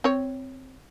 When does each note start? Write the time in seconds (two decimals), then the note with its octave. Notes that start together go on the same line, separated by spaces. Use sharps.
0.04 C4 C#5